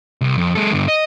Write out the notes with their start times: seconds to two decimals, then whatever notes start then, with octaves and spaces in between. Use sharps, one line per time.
0.21 C2
0.38 F2
0.55 G#3 A4
0.72 G2 D3
0.88 D#5